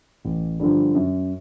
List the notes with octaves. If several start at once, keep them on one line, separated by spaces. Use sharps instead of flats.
A1
G2 D3 F3
F#2